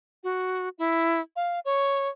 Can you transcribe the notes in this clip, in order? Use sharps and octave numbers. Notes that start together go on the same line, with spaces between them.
F#4
E4
F5
C#5